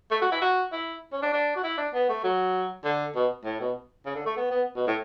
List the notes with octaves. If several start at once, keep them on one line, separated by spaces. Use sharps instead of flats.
A3
F#4
E4
F#4
E4
C#4
D4
D4
F#4
E4
D4
B3
A3
F#3
D3
B2
A2
B2
C#3
D3
A3
B3
B3
B2
A2